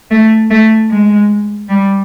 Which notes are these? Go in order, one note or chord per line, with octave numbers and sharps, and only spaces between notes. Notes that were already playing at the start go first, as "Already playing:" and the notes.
A3
A3
G#3
G3